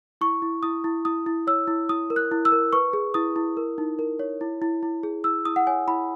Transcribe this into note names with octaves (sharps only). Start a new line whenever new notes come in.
E4 C#6
E4
E4 D#6
E4
E4 D#6
E4
C#5 E6
E4
E4 D#6
A#4
F#6
E4
E6
A#4
B4 C#6
G#4
E4 D#6
E4
A#4
D#4
A#4
C#5
E4
E4
E4
G#4
E4 E6
E4 D#6
F#5
C#5 G#5
E4 B5